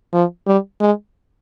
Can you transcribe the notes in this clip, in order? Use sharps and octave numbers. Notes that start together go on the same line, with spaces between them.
F3
G3
G#3